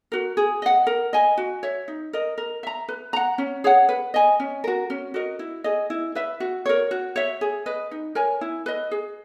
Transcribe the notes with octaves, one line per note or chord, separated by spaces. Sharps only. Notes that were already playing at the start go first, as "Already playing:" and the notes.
F#4 A#4
G#4
D#5 F#5
A#4
D#5 G#5
F#4
C#5 E5
D#4
A#4 D#5
A#4
E5 A#5
B4
F#5 A#5
C#4
G#4 C#5 F#5
B4
D#5 G#5
C#4
F#4 A#4
C#4
F#4 A#4 D#5
E4
G#4 D#5
E4
B4 E5
F#4
A#4 C#5
F#4
C#5 E5
G#4
B4 D#5
D#4
A#4 C#5 G#5
E4
B4 D#5
G#4